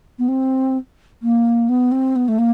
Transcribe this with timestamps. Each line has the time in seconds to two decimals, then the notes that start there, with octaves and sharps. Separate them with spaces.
0.18 B3
0.28 C4
1.22 A#3
1.68 B3
1.91 C4
2.15 B3
2.28 A3
2.38 A#3